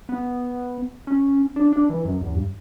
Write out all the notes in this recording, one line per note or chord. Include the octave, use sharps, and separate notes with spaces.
B3
C#4
D4
D4
E3
F#2
E2
G2